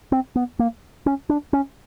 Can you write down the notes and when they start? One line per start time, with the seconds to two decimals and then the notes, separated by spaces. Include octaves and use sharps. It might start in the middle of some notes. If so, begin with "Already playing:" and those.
0.12 C4
0.36 B3
0.59 A#3
1.06 C#4
1.29 D4
1.53 C#4